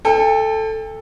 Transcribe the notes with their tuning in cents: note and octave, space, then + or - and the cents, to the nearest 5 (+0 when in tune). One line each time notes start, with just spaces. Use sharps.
A4 +0 G5 +40